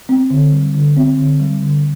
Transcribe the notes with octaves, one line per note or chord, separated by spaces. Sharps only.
C4
D3
G3
D3
C4
D3
G3
D3